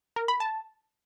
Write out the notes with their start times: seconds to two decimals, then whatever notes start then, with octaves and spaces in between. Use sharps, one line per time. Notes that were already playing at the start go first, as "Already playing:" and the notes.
0.16 A#4
0.28 B5
0.40 A5